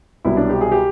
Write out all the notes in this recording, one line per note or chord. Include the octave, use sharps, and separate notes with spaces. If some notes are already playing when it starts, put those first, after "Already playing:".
C2 B2 F#3 E4
D4
G4
G#4
G4